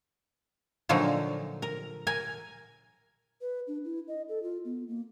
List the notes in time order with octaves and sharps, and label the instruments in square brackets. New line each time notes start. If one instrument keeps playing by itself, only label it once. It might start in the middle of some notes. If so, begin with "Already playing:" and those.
[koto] A#2 D3 F3 F#3 D#4
A#4
A#4 G#5
[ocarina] B4
D4
E4
D#5
A4
F4
B3
A#3